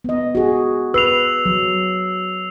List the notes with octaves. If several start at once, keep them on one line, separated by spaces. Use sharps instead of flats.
B3 D#5
F#4 G#4
B4 E6 C7 F7
F#3